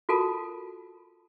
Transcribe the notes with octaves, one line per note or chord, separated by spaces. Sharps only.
F4 F#4 A4 A#4 A5 B5